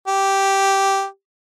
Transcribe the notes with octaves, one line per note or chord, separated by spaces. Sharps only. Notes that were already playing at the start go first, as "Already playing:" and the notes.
G4